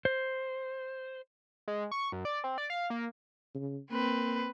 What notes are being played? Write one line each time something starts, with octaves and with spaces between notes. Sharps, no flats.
C5
G#3
C#6
F#2
D5
C4
D5
F5
A#3
C#3
A#3 C4 B4